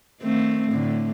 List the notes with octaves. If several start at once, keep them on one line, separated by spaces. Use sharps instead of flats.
D#3 A3 C4
A2 D3